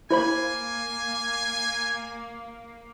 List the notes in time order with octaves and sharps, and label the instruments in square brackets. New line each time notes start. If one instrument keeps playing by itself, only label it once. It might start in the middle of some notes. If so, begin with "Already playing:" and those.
[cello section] A#3 [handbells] E4 C5 B5 [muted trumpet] G#5